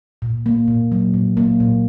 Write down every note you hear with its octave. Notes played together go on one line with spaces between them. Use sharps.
A#2
A#3
A#2
F#3
A#2
A#3
A#2